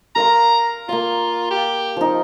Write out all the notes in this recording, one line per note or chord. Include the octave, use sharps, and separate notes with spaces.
A#4 F5 A#5 C6
A#3 F4 F5
G4
F3 D#4